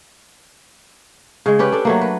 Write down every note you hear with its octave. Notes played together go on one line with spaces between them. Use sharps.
C#3 G#3
C#4 G4 B4 D5
D4 A4
F#3 A3 A#3
B4